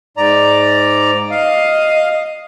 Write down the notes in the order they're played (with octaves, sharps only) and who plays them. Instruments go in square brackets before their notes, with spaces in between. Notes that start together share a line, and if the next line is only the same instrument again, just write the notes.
[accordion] G#2 D5 A#5
[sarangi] D#5 [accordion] F5